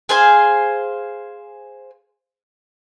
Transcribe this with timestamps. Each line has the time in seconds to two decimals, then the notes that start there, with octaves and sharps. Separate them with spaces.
0.09 G#4 C5 F5 G#5